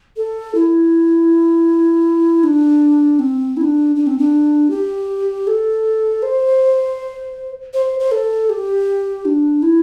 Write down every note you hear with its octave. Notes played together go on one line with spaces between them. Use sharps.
A4
E4
D4
C4
E4
D4
D4
C4
D4
G4
A4
C5
C5
C5
A4
G4
D4
E4